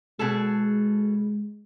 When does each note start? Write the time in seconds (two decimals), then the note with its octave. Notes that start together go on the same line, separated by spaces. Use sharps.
0.19 B2 G#3 G#4 A4